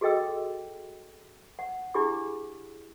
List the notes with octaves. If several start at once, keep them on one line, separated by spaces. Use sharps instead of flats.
F#4 G#4 A4 D#5 G5 E6
F#5
D4 E4 G4 G#4 B5 D6